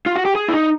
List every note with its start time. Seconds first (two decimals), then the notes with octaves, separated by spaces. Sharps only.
0.06 F4
0.16 F#4
0.25 G4
0.35 G#4
0.48 E4
0.54 D#4